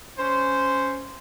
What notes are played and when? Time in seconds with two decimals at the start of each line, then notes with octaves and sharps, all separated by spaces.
0.18 C#4 C5